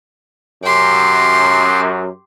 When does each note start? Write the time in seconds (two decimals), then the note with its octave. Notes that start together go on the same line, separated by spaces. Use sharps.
0.64 F#2 G4 C6